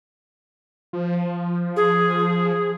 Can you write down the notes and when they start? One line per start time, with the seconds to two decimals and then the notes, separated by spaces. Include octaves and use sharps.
0.93 F3
1.76 G#4